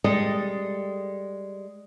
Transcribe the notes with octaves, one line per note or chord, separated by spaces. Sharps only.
G3 G#3 A4 D#5